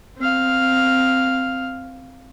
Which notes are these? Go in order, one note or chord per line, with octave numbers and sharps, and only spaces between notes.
C4 F5